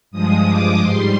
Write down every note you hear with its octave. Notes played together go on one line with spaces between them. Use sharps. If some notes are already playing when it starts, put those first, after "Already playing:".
G2 F3 G#3 D#6
D6
G#2 G3 C6